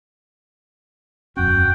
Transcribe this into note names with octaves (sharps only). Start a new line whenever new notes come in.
E1 F#2 C#4 F#4 G5